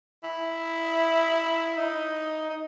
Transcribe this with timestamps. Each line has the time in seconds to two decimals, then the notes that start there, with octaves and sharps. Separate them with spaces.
0.23 E4
1.77 D#4
2.50 D#4